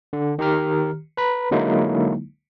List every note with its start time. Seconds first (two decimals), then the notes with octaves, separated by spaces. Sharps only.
0.13 D3
0.39 D#3 G4 A#5 F6
1.17 B4 A#5 B5
1.51 D3 F#3 G#3 A#3 D#4 E4